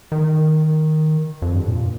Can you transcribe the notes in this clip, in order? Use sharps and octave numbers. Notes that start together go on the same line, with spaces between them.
D#3
F2
G2
A#2